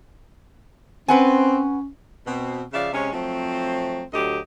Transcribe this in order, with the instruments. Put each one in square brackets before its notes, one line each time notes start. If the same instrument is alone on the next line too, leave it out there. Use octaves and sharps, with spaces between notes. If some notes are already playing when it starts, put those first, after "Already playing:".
[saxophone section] C4 [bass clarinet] C#4 [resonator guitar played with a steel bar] B4 F#5 G#5
[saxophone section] B2 C4
C#3 F3 D5 E5 F5
C3 G#3 C#4
F3 F#3 A3 C4
D2 D3 F#3 G4 D#5